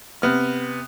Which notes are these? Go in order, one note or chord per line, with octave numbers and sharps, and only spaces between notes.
C3 B3 F6